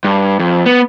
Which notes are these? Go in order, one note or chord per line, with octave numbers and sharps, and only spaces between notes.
G2
F2
B3